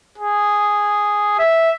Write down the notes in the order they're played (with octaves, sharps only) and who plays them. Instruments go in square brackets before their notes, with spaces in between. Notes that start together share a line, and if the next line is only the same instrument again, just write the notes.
[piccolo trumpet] G#4
E5